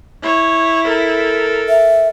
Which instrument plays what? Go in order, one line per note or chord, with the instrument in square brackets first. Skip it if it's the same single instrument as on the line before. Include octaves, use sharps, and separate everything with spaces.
[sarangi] E4 [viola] C#5
[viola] A4 A#4
[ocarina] E5